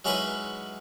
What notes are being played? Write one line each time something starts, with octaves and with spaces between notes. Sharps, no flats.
F#3 G#3 C#4 D#4 E4 B4